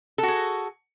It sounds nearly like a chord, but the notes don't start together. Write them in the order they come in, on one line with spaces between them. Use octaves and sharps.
A4 F#4 G#4